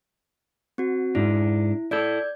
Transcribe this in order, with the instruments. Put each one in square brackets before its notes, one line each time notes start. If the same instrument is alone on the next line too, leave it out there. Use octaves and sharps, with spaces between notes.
[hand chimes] C4 F#4
[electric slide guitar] G#2 D4 [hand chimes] E4
[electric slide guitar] E4 A4 [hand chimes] D5 G6 G#6